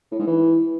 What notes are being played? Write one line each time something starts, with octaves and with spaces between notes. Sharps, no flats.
A2
G#2
E3